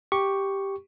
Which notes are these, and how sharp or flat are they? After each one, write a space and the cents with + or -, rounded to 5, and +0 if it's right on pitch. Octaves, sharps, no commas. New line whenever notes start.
G4 +0 C#6 +0